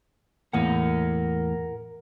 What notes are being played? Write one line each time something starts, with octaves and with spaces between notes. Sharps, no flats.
E2 A2 A#3 A#4 F#5